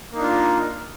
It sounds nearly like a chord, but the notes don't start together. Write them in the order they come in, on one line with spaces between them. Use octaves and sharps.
A#3 D#4 D4 F4